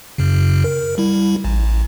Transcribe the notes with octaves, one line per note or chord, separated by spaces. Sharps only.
F#2 C#3
A#4
G3 E4
A1